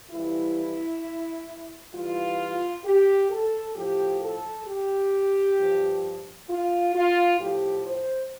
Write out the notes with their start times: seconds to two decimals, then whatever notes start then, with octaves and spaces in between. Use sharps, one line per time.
0.11 F2 E3 G3 E4
1.93 E2 E3 G3 F4
2.84 G4
3.30 A4
3.75 A2 F3 G4
4.21 A4
4.67 G4
5.57 G2 F3
6.49 F4
6.94 F4
7.39 A2 F3 G4
7.85 C5